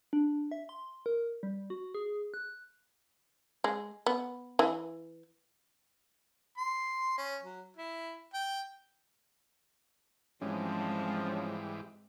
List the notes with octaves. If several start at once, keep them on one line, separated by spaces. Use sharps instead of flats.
D4
E5
C6
A#4
G3
F#4
G#4
F#6
G#3
B3
E3
C6
C#4
F#3
E4
G5
G#2 E3 F3 G3 G#3 C4 C#4